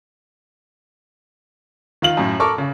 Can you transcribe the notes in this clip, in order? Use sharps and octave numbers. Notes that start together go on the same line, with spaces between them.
D#3 F4 F#7
F#2 A2
A4 A#4 C#6 D6
C#3